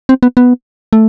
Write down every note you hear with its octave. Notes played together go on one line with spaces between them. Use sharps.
C4
B3
B3
A3